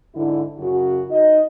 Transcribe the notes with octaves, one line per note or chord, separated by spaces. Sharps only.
G#2 D3 E4
F#2 C#3 F#4
D#4 D#5